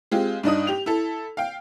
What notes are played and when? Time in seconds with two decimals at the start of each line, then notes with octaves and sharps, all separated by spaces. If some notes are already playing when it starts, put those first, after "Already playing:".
0.12 G#3 C4 F4 G4
0.43 G2 D4 D#4 D#6
0.67 G4 F7
0.86 E4 A4
1.37 F5 G5